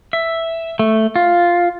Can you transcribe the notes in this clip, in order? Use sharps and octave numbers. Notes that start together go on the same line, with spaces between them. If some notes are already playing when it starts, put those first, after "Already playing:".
E5
A3
F4